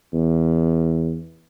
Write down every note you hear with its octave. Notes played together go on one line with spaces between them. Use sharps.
E2